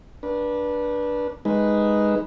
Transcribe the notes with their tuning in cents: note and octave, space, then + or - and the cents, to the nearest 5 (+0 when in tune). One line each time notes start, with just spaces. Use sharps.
D4 +0 B4 -25
G#3 +0 D#4 +0 B4 +0